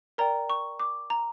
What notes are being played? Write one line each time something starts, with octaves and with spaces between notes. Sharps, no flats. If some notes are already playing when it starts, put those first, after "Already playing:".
A#4 D5 G5 A#5
C#6
D6
A#5